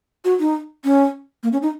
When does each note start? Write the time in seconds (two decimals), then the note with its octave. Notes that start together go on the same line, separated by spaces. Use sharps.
0.25 F#4
0.40 D#4
0.85 C#4
1.43 A#3
1.53 C#4
1.62 D#4